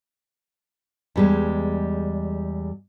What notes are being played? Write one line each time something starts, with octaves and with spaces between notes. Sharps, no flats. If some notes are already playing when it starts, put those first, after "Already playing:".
E2 G3 G#3